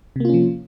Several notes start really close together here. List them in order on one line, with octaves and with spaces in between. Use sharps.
C3 A#3 F4 C#4 F3